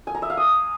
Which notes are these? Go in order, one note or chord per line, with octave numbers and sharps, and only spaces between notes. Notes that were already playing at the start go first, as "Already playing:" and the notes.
G#5
A#5
E5
F5
D#6